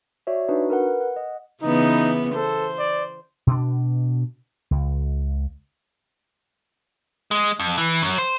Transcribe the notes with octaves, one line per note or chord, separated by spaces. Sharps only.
F#4 C#5 D5 E5
D4 D#4 F#4 B4
A#4 B4 F#5
F#5
D#5
C#3 E3 B3 D#4
A4 C5
D5
B2 D4
C#2
G#3
F2
E3
F#2
C5